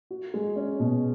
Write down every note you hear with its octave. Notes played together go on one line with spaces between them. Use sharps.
F#4
G#3
C#4
B2